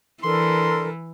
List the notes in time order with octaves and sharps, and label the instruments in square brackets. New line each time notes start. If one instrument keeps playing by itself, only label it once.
[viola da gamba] E3 [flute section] D4 A4 A#4 [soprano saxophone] C6